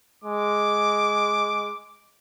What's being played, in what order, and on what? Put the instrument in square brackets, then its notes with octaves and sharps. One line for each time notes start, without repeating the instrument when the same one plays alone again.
[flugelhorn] G#3 [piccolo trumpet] D6